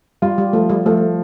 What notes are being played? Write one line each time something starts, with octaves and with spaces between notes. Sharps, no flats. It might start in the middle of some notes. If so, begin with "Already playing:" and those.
G3 F4
G3
F3 A3
G3
F3 A3